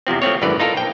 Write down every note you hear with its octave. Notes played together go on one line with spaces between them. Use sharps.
E2 C3 F3 C4
F3 A3 C4 C#5
G#1 F#2 D3 E3 B4 D5
D#4 F4 A4 A#4
A#1 G5